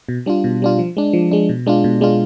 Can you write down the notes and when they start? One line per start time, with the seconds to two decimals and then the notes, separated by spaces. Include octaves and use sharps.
0.09 B2
0.26 G3 D4 F4
0.44 B2
0.62 G3 D4 F4
0.79 F3
0.97 G#3 D4
1.13 F3
1.31 G#3 D4
1.49 B2
1.66 G#3 D4 F4
1.84 B2
2.01 G#3 D4 F4